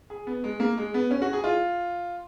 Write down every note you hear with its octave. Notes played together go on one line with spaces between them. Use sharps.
G#4
B3
G#3
A#3
G#3
B3
C#4
F#4
G#4
F4